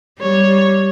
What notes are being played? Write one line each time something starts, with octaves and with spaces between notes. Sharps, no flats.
G3 C#5